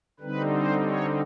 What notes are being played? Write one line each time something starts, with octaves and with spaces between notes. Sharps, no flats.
D3 G3 C4 D#4 B4
C5
C#5